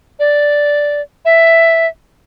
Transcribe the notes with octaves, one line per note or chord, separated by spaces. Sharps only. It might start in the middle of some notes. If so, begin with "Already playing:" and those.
D5
E5